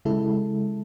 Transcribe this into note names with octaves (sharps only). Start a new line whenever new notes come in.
C#3 G#3 E4 A4